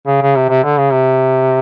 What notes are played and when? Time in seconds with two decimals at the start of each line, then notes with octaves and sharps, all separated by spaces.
0.07 C#3
0.22 C#3
0.36 C3
0.49 C3
0.64 D3
0.78 C#3
0.92 C3